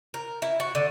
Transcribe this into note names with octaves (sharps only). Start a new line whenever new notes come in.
A#4
E4
F#4
D3